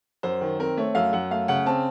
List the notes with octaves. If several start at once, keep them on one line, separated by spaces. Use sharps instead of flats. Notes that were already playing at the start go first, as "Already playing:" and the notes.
F#2 C5
D#3
C4 A#4
A3 C#5
F#2 F5
F#2 F#5
A3 F5
C#3 F#5
C4 A5